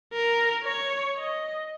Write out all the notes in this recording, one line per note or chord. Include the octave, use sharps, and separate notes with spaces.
A#4
C#5
D#5